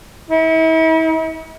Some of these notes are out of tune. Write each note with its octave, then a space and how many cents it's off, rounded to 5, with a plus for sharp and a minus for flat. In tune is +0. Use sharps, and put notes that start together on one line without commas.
E4 -40